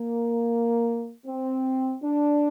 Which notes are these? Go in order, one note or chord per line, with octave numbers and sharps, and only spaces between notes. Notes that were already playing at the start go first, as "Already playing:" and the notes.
Already playing: A#3
C4
D4